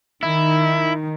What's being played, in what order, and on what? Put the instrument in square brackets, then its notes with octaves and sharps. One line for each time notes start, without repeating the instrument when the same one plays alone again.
[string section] D#3 [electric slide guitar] E4